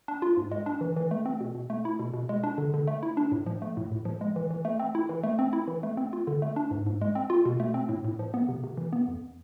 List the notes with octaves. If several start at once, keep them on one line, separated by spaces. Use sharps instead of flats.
D4
F4
G#2
G#3
D4
E3
E3
A3
C4
B2
B2
A3
E4
B2
B2
G#3
D4
D3
D3
A3
E4
D4
A2
F3
A3
A2
A2
F3
G#3
E3
E3
A3
C4
E4
E3
A3
C4
E4
E3
A3
C4
F4
D3
A3
D4
G#2
G#2
G#3
C4
F4
B2
A3
C4
A2
A2
F3
B3
C3
C3
E3
B3
F2